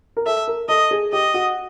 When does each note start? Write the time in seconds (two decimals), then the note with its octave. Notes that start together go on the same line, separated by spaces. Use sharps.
0.17 A#4
0.26 A4 E5
0.48 A#4
0.69 A4 D#5
0.91 G#4
1.13 G4 D#5
1.34 F#4